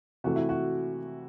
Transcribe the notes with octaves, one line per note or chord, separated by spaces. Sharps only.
C3 E3 A3 F#4
E4
F#4